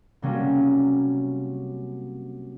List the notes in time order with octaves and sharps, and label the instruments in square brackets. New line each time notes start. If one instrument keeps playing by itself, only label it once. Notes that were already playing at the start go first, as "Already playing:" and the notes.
[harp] C3 F#3 G3 A#3 C#4